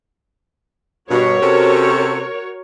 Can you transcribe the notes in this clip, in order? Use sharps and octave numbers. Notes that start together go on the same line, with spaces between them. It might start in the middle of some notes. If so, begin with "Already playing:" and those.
G2 B2 F#4 A#4 C#5
C3 C#4 A4